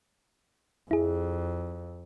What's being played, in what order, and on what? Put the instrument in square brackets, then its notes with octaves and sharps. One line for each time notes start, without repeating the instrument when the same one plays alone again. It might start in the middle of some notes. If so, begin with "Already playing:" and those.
[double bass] F2 [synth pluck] E4 G#4